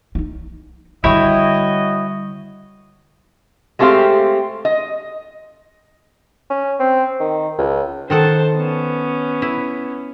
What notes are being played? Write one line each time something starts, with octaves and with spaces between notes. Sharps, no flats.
D#4 F4
D3 G3 E4 F#4 C#5 D#5 G5
G#3 A3 C4 G4 F5
D#5
C#4
C4
D#3
C#2
D#3 A4 C5 F#5 A5
B3 C#4
E4